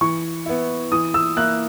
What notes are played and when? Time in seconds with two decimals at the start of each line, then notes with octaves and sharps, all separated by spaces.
0.01 E3 C#6
0.46 B3 E4
0.91 E3 D#6
1.14 E6
1.37 A#3 E4 F#6